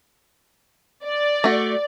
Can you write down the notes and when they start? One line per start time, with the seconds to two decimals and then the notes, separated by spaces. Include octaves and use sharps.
1.04 D5
1.44 A3 F#4